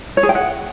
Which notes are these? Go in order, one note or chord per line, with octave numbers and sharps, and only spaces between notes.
C#5
G#4
G5
F#5